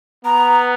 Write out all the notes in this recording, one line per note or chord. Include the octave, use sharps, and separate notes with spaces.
B3 A#5